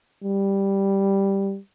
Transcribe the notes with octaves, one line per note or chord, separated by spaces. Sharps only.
G3